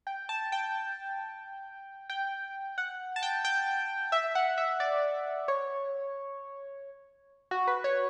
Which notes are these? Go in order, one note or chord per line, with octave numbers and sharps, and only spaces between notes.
G5
A5
G5
G5
F#5
A5
G5
G5
E5
F#5
E5
D5
C#5
F#4
B4
C#5